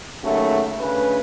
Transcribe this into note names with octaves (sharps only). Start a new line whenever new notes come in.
D#2 C#3 F#3 A3
D2 C#3 B4